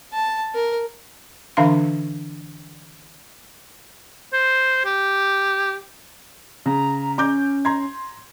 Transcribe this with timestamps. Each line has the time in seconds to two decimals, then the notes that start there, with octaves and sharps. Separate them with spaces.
0.13 A5
0.54 A#4
1.57 D3 E3 D4 E5 F5 C6
4.33 C5
4.85 G4
6.66 C#3 A#5
7.18 C#4 A#5 D6 G6
7.65 A#5 C6 G#6